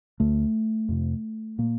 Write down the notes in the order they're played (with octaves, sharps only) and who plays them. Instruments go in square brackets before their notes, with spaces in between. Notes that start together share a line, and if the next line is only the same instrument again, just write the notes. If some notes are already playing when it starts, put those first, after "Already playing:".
[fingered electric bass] D2 D3 A3
F2 C3
A#2 A#3